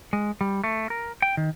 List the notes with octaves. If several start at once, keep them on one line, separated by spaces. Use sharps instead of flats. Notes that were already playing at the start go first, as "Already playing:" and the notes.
G#3
G3
A3
A#4
G5
D#3